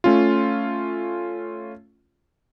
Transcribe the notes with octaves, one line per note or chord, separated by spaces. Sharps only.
A3 C#4 F4